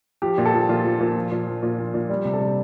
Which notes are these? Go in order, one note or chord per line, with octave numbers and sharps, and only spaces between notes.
F3 G4
A#2
A4
F3
A#2 F4
F3
A#2
F3
A#2
F3
A#2
F3
A#2
G3
C3
A4
G3